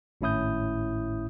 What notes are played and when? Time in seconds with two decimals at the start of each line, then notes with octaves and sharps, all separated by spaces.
0.21 G#1 A2 C#4 E4 D#6 G6